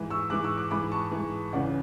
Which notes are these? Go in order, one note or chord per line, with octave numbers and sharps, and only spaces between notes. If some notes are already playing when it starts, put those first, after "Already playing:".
Already playing: G#2 E3
C#6 E6
G#2 E3 D6 F#6
C#6 E6
D6 F#6
G#2 E3 B5 D6
A5 C#6
G#2 E3
C#2 C#3 E3 D5 F#5